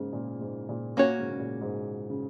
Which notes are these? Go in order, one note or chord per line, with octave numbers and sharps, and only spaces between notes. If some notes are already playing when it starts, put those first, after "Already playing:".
Already playing: G#2 C#3 A#3
A#2
G#2
A#2
A#2 A#3 C#4 F#4 C#5
G#2 C#3
C#3
A#2
G#2
C#3